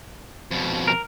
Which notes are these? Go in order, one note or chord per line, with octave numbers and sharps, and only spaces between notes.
F2 B2
A#4